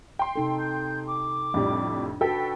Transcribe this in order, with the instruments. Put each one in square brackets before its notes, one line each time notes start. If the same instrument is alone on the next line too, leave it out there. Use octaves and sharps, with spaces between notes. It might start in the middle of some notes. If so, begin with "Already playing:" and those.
[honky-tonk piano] G5 C6
[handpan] C3 D#4 A4
[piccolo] G6
D6
[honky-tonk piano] F2 A2 G3 [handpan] D4
[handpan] F#4 B4 [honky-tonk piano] A4 G5 [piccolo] B6